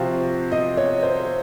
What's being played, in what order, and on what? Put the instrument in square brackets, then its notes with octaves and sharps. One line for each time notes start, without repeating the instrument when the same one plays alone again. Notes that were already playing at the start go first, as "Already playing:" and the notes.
Already playing: [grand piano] C3 F3 C4 F#4 [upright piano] F5
[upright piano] D#5
C#5
C5